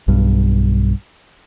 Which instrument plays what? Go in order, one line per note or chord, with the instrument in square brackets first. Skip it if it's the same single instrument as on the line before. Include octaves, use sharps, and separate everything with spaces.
[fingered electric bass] B1 G2